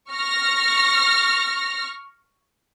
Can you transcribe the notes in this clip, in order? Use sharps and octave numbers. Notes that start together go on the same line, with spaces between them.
C#6 F6 A#6